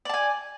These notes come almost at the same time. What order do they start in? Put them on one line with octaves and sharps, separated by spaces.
D5 A5 G#5